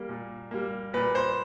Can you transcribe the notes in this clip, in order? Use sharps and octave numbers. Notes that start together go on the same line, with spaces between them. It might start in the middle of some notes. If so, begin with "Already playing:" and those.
Already playing: G3 A#3
A#2
G3 A#3
A#2 B4
C5